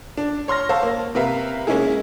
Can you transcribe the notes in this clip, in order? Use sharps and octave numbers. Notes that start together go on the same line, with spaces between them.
D4
C#5 C6 F6 A#6
C5 C#5 F5 A5 E6
A#3
C3 A#4 B4 E5 F5
G#3 A#3 C#4 D#4 E4 G#4